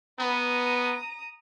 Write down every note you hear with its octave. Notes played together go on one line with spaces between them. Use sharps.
B3 A#5 D#6